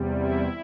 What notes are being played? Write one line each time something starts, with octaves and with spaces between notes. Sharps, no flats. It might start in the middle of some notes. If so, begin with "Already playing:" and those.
Already playing: E2 C3 G3
E4